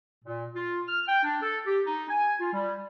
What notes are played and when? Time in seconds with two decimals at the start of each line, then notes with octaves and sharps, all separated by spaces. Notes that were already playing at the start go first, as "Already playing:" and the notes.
0.25 A#2
0.55 F4
0.88 F6
1.08 G5
1.24 D4
1.42 A4
1.66 G4
1.86 D#4
2.09 G#5
2.40 F4
2.53 G3